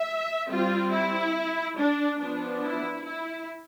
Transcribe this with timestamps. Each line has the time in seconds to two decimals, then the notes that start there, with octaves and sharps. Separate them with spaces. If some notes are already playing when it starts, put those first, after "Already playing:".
Already playing: E5
0.50 G3 C4 F4
0.92 E4
1.77 D4
2.21 F3 B3 D4
2.64 E4
3.06 E4